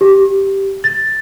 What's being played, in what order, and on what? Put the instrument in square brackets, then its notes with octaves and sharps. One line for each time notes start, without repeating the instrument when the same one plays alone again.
[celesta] G4
A6